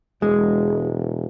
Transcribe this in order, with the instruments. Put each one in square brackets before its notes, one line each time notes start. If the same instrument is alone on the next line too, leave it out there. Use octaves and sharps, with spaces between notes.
[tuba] E1 [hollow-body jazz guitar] G#3